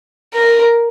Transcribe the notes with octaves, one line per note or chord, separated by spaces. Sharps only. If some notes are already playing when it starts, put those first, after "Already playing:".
A#4